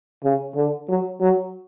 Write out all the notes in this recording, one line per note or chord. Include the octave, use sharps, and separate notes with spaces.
C#3
D3
F#3
F#3